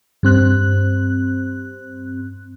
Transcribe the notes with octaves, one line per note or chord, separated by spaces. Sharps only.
G2 C4 F#6